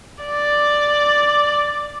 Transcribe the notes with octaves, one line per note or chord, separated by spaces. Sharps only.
D5